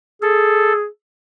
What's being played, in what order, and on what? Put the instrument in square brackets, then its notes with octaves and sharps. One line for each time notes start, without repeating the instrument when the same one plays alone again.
[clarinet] G#4 [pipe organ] A4